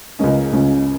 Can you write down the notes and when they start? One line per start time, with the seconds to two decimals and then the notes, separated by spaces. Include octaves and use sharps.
0.19 C#2 C#3 G#3 C#4 A#4 D#5
0.53 C#2 C#3 G#3 C#4